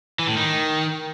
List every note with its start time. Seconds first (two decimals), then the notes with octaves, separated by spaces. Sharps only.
0.19 E3
0.28 A2
0.37 D#3